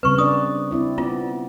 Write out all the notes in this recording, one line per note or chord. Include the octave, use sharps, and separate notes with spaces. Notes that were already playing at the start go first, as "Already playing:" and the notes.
C#3 G3 C4 B4 C#6
D4 B4 D5 D#6
C4 E4 D5
B3 F4 D5